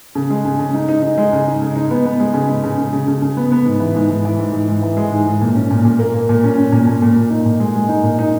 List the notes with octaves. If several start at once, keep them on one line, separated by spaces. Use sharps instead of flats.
C#3
G#3
C#3
C#3
D#4
D#4
D#4
G#3
C#3
D#4
C#3
D#4
B3
B3
G#3
C#3
G#3
C#3
C#3
C#3
C#3
C#3
B3
B3
G#2
E3
G#2
G#2
E3
G#2
G#2
G#2
E3
G#3
G#2
G#2
A#2
C#4
A#2
A#2
A#3
A#3
A#2
C#4
C#4
A#2
A#2
A#2
A#2
D#4
A#2
G#3
G#3
D#4
A#2
D#4